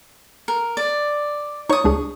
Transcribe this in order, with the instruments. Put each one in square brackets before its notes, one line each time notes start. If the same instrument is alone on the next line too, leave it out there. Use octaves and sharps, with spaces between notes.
[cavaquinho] A#4
D5
[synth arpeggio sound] D#4 C#5 [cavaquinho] C#6 D#6
[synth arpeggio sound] C#2 D4 G#4